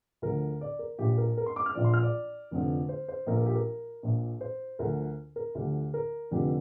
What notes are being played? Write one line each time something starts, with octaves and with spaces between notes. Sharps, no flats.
D2 D3 F3 A#4
D5
A#4
A#1 A#2 F3 G4
A#4
A#4
C6
D6
F6
A#1 A#2 F3 D5
C6
F6
D5
F1 F2 D3 F3
C5
C5
A#1 A#2 F3 A#4
A#4
G4
A#4
A#1 A#2 F3
C5
D2 D3 F3 A#4
A#4
D2 D3 F3 G4
A#4
F1 F2 D3 F3 G4